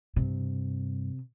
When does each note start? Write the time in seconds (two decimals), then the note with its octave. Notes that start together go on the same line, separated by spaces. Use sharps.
0.16 G2 C3